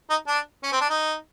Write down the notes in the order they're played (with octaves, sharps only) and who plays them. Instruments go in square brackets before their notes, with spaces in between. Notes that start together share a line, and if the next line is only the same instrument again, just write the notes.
[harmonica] D#4
D4
C#4
C4
D4
D#4